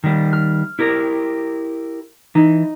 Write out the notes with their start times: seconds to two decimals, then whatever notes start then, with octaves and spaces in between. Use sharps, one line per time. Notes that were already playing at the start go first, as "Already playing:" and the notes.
0.04 D#3 G3
0.33 F6
0.79 E4 G4 A#4
2.35 E3 D#4